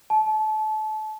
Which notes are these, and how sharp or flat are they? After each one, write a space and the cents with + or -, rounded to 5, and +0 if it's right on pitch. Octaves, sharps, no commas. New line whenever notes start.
A5 -30